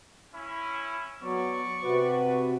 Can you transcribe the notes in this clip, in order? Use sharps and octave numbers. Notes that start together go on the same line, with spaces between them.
C#4 E4
F#3 B3 D5 C#6
C3 F#4 B4